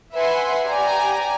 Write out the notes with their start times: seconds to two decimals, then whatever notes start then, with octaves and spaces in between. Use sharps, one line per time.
0.14 B4 E5 F#5 G#5 C6
0.67 G4 D5 G#5 A#5